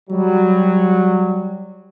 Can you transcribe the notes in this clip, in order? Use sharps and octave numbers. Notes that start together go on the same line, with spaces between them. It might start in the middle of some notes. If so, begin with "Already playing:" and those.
F#3 G3